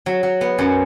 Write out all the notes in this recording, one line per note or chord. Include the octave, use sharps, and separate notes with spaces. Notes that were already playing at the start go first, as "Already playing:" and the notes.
F#3
F#3
B3
F#2